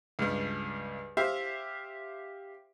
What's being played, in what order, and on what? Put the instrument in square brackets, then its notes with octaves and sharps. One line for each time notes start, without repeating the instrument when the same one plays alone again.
[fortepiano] C#2 G2
G4 C5 E5 F5